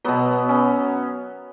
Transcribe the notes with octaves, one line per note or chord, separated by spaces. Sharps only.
B2 F#3 B3
C#4